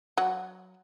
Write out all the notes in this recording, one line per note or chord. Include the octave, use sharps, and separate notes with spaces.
F#3 F#5